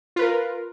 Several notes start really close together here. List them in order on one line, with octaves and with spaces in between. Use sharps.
F4 B4 A#4